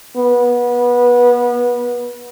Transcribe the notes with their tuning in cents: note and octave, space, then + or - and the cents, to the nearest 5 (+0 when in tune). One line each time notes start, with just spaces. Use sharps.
B3 -25